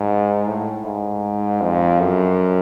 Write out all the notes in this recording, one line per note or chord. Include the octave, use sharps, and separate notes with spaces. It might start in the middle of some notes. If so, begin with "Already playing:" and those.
Already playing: G#2
A2
G#2
F2
F#2